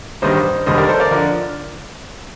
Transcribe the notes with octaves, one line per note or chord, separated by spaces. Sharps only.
A1 G2 D#3 G3 C5 D#5
F1 D#2 D3 G3 C5 D#5
A#4 D5
A4 C5
A#4 D5
D3 F3 A#4 D5